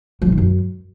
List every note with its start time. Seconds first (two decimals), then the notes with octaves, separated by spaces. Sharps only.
0.22 F#3
0.27 C3
0.32 D#3
0.38 F#2